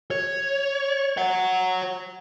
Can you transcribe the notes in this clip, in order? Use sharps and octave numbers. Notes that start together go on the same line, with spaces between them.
C#5
C#5 F#5